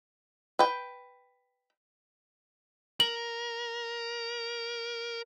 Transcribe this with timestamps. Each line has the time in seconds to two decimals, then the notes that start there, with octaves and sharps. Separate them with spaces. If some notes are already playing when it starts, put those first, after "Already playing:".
0.59 B4 G5
3.00 A#4 F#7